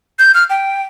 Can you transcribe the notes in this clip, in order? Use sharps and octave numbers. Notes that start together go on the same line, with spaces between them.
G6
F6
G5